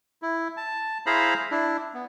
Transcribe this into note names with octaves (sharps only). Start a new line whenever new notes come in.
E4
A5
E4 G#4 C5 F5 A#5 B5
D4 E4
B3